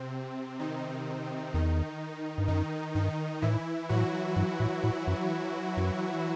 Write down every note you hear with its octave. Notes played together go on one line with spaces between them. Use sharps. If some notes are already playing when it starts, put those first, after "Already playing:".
Already playing: C3 C4
D#3 D#4
E2 D#3 D#4
G2
F#2 D#3 D#4
G2 D#3 D#4
A2 E3 E4
A2 F#3 F#4
G2
A2
A2
F#2
F#2